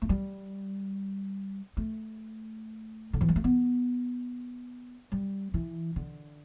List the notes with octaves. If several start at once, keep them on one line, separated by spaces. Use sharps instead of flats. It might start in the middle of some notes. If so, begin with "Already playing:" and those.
A3
G3
A3
D3
E3
G3
A3
B3
G3
E3
D3